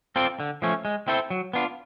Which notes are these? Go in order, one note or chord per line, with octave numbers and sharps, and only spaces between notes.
C4 F4 A4 D5
D3
F3 A3 C#4
G#3
C4 E4 A4 C5
F#3
B3 D4 F4